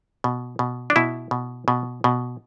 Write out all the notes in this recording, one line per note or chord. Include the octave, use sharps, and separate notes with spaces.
B2
B2
D4
B2 E4
B2
B2
B2